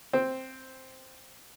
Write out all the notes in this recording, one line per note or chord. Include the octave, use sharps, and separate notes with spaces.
C4